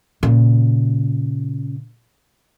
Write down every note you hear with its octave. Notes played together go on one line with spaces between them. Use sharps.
A#2 C#3